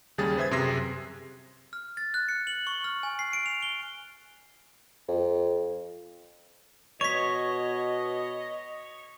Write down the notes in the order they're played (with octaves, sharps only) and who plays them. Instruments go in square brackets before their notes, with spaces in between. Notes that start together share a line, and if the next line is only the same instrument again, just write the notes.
[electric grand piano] D#2 C#3 G3 G#4 A6
B4 C5 E5 D#6 G#6
F#2 C3 G#4 C6 A#6 C7
[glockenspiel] F6
A6
F#6
C#7
F#7
C#6
F6
G#5
C7
D7
F7
G7
[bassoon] F2
[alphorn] B2 [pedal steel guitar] C#5 [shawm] D#5 [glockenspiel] C#6 B6